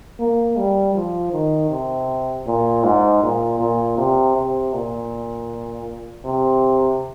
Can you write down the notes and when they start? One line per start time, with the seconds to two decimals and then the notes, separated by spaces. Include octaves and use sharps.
0.20 A#3
0.57 G3
0.95 F3
1.33 D#3
1.71 C3
2.46 A#2
2.84 G#2
3.22 A#2
3.60 A#2
3.98 C3
4.36 C3
4.74 A#2
6.25 C3